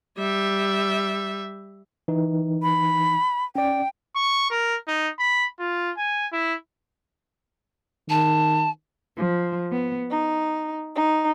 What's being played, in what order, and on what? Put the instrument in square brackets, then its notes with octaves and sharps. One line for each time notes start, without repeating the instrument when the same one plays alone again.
[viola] G3 E5
[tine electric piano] E3 D#4
[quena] B5
[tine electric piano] C#4 D5 [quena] G5
[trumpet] C#6
A#4
D#4
B5
F4
G#5
E4
[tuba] D#3 [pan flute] A5
[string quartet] F3
B3
D#4
D#4